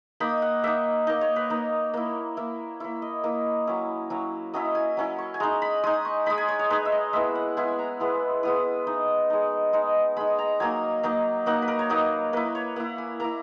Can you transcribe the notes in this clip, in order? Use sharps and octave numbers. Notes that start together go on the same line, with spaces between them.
A#3 D#4 B5
F#5
A#3 D#4 E5
A#3 D#4 D#5
C#5
B4
A#3 D#4
A#3 E4
A#3 E4
A#3 E4 C#5
D#5
A#3 E4 D#5
F#3 C#4 E4
F#3 C#4 E4
F#3 C#4 E4 D#5
G#5
F#3 C#4 E4
C#6
G#5
G#3 D#4 A#5
B5
G#3 D#4 D#6
C#6
G#3 D#4 B5
G#5
C#5
C#5
G#3 D#4 B4
E5
D#5
G#3 B3 E4 E5
F#5
G#3 B3 E4 G#5
A#5
G#3 B3 E4
G#3 B3 E4 D#6
G#3 D#4
G#3 D#4
G#3 D#4
G#3 D#4 B5
A#5
F#3 A#3 D#4 G#5
F#3 A#3 D#4
F#3 A#3 D#4 F#5
B4
A#4
C#5
F#3 A#3 D#4 B4
A#3 E4 B4
C#5
A#3 E4 F#5
G#5
A#3 E4 A#5